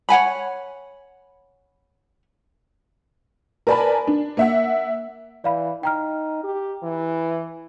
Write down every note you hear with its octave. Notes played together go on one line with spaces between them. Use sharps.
C#5 F#5 G#5 B5
A#4 B4 D5 G#5 A5 B5
D4
A#3 E5 F#5
E3 D5 F5 B5
D#4 G5 A#5 F6
G4
E3